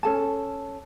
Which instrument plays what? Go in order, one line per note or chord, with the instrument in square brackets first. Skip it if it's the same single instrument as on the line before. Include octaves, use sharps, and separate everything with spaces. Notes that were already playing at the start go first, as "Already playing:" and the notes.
[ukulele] C#4 A4 A5